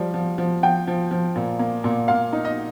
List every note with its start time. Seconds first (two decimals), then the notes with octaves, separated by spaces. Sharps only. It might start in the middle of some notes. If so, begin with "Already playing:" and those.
Already playing: F3 G3
0.14 F3
0.38 F3
0.63 F3 G5
0.87 F3
1.11 F3
1.36 A#2
1.59 A#3
1.84 A#2
2.08 A#2 F5
2.33 D#4
2.45 D#5